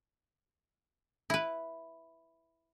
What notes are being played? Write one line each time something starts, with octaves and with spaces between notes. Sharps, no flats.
E4 B4